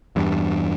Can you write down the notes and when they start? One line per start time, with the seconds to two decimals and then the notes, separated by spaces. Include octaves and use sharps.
0.16 E2 G2